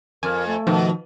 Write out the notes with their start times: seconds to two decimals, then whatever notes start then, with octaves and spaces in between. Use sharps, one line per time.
0.23 F2 A#4 G#5
0.47 A3
0.67 B2 D#3 F3